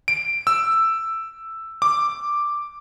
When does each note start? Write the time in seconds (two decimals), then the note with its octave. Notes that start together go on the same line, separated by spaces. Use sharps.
0.08 D7
0.47 E6
1.82 D6